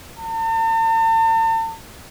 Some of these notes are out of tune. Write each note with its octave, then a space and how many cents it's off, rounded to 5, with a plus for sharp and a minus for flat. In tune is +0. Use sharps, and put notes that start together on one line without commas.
A5 +45